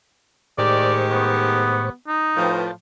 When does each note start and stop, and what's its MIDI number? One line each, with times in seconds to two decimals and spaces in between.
0.58 1.90 45
0.58 1.87 51
0.58 1.87 56
0.58 1.87 67
0.58 1.90 72
0.58 0.96 74
0.58 1.90 85
1.12 1.93 59
2.07 2.59 63
2.37 2.69 45
2.37 2.69 53
2.37 2.71 71
2.37 2.71 79
2.37 2.71 81